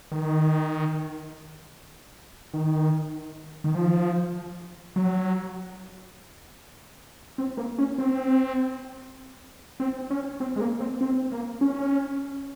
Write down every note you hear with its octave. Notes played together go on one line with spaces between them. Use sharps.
D#3
D#3
D#3
F3
F#3
C4
A#3
C#4
C4
C4
C#4
C4
G#3
A#3
C4
C4
A#3
C#4